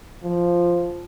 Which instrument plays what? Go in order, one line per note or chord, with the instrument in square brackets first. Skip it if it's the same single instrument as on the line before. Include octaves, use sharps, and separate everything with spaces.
[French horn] F3